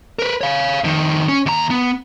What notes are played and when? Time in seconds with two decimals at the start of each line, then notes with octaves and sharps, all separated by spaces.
0.19 A#4 B4
0.41 C#5 F5
0.84 F2 D#3
1.29 C#4
1.46 D#2 A#5
1.70 B3